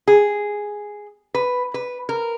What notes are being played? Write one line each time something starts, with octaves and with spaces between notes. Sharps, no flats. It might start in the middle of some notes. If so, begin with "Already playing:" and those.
G#4
B4
B4
A#4